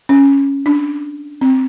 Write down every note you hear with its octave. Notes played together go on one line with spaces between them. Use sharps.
C#4
D4
C4